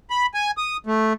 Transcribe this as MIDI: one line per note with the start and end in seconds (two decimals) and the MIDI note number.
0.10 0.26 83
0.34 0.51 80
0.58 0.77 87
0.87 1.13 57